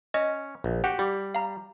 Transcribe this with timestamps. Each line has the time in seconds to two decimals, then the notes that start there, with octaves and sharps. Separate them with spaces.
0.14 C#4 D#5
0.64 A#1
0.84 F#4 G4 F#5
0.99 G3 G4
1.35 F5 A#5